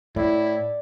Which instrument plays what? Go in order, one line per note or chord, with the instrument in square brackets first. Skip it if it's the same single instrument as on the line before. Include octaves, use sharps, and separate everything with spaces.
[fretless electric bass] A2 [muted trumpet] E4 [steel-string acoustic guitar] D5